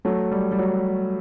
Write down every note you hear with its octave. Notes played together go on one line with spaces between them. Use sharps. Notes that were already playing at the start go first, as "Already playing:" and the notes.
F#3 A3
G3
G3
F#3